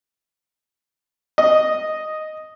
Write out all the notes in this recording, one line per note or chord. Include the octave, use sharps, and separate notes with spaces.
D#5